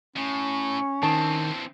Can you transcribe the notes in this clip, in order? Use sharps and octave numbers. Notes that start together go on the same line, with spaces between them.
A2 C#4
D#3 E3 C4 A5